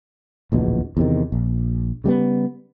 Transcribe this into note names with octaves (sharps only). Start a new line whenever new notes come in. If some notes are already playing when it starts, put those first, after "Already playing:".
D1 A#1 E2 B2
E2 C3 D#3
A#1
C#3 G3 G#3 B3